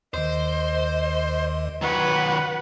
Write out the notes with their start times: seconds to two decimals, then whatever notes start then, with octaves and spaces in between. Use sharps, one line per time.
0.14 D#2 D#3 C5 D#5
1.82 D#3 F#3 B4 F#5